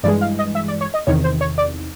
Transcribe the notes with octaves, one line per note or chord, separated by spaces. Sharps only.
G2 E3 G#3 D5
F5
D#5
E5
D5
C#5
D#5
E2 C3 D#3 C#5
C5
C#5
D5